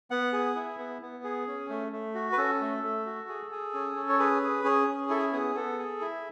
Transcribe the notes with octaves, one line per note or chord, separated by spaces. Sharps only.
B3 F#5
G#4
E4
B3
B3
G#4
C#4
A3
A3
F#4
B4
C#4 A4
A3
A3
F#4
G#4
G#4
C#4
C#4
C#5
G#4 B4
G#4
C#4 G#4
C#4
E4 A4
G#4
B3 G#4
B3 A4
G#4
E4